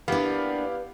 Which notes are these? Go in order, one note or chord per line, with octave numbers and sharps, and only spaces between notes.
A#3 B3 D4 E4 G4 B4 F5